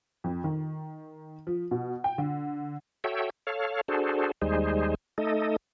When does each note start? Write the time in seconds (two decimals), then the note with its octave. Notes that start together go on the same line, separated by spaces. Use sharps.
0.24 F2
0.44 D#3
1.47 F3
1.71 B2
2.04 G5
2.18 D3
3.04 F#4 A4 C#5 E5 G5
3.47 A4 C#5 F5
3.88 D4 F#4 G#4 A4 C5
4.42 D#2 G3 G#3 D#4 G#4 C5
5.18 A3 D#4 A4 D#5